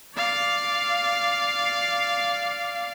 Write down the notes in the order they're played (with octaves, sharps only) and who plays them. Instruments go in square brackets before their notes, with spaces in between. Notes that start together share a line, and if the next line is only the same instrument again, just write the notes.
[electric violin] D5 F5